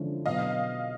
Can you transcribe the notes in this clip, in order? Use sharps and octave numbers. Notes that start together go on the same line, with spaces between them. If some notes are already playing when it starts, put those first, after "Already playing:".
Already playing: D3 F3 G#3 C#4 E4
B2 F#3 B3 D#5 F5